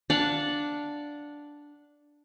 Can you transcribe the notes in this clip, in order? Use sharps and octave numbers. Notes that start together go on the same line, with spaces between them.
D4 F5 F#5